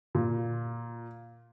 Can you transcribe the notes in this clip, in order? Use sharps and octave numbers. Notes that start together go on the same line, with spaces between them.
A#2